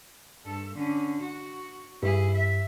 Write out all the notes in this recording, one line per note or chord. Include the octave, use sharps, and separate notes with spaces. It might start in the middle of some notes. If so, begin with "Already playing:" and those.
G2 A4
D3 C#4
F#4
G2 E4 G#4
E5